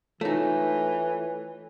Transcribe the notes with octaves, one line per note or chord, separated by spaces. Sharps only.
E3 A3 D#4 F4 C#5